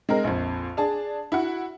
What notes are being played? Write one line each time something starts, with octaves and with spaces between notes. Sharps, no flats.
G#3 C4 A#4
A#1 F2
D4 G#4 A5
E4 F#4 F#5